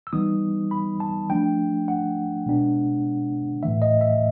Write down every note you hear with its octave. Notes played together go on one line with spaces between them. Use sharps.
E6
E3 G3 B3 D#4 D#6
B5
A5
F3 A3 D4 G5
F#5
B2 G#3 B3 D4
A2 E3 A3 E5
D#5
E5